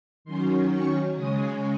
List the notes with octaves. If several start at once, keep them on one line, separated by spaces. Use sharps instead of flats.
D#3 F#3 C#4 C6
C#6
C#3 G#3 C#4 D#6